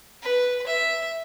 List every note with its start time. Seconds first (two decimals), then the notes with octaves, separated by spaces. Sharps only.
0.22 B4
0.66 E5